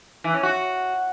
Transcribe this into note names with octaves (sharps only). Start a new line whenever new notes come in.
E3
C#4
F#4